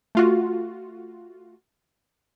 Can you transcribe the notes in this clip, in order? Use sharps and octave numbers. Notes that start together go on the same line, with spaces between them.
A3 F4 F#4